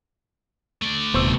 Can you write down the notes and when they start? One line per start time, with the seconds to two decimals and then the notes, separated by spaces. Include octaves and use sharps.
0.82 A3 D5
1.14 D#1 C3 B3 C5 C#6 E6